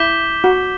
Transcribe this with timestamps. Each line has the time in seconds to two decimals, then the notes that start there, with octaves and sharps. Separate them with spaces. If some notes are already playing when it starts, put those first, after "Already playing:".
Already playing: E4 D6 G6 B6 E7 G7
0.44 F#4